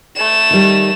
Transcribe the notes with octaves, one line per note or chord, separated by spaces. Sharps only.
A3 E7
D#3 G3